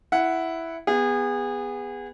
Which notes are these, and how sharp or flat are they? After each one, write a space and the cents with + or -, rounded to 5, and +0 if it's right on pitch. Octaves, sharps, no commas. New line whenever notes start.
E4 +0 F#5 +0
B3 +0 G#4 -30